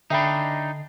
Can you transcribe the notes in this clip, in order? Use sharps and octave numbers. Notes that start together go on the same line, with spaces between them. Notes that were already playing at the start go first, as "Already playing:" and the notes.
D3 D4 D#4 D#5 E5 G5 B5 C7